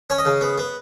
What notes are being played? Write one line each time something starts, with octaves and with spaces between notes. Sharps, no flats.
C#4 C#5
D#5
C#3
B3
B3